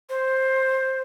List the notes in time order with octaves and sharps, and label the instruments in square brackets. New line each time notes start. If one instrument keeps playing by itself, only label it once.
[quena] C5